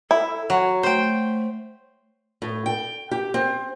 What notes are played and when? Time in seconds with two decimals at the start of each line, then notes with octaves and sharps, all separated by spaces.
0.11 E4 A4
0.50 F#3 C#5
0.83 A3 C5 G5
2.42 A2
2.66 G5
3.11 G4
3.34 C4